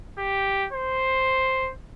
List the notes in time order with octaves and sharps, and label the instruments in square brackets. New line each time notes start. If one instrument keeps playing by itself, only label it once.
[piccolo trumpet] G4
C5